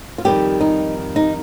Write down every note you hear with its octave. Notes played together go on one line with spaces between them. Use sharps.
F4
F2 D#3 G3 G4
D#4
D#4